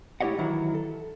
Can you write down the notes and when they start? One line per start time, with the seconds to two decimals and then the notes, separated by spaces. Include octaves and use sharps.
0.21 A3 E4 G4 C#5 D#5 F#5
0.38 D#3 E3 F#3 E4
0.74 A4